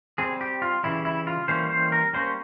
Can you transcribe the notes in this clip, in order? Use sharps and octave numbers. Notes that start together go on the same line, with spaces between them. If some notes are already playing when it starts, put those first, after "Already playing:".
G3 C4 G#4
G4
F4
C#3 E3 G3 E4
E4
F4
E3 G3 A#3 C#4 C5
C5
A#4
G3 A#3 C#4 C5